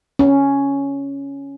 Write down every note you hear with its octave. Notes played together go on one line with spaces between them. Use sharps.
C#4